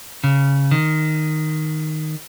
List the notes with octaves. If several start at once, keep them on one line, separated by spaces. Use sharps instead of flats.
C#3
D#3